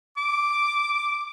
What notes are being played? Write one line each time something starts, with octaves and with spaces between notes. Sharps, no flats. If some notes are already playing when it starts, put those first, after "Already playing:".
D6